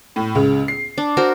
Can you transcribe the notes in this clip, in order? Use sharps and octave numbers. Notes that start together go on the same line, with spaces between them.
A2
C#2 C#3
C7
D4
F#4 A#4 C5